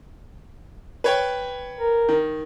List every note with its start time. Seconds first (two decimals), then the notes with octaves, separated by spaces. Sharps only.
1.04 B4 C#5 G5
1.79 A#4
2.09 D#3